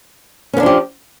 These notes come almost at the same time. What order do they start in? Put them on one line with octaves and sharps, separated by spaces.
C#4 B3 D4 F3 G4